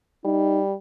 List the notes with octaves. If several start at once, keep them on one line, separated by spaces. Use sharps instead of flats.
G3 D#4